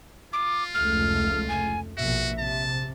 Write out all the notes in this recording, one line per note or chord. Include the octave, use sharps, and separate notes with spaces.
F4 D6
F1 C#2 A3 F6
G#5
A#1 B2 F#4 E5
C3 A5